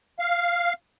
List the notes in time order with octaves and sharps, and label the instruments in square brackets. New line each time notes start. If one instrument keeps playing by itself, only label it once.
[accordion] F5